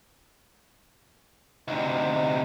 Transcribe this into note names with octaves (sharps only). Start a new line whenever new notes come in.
D2 C3 D#4